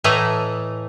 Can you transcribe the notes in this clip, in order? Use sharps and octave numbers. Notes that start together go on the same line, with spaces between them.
A2 E3 A3 D#5 A#5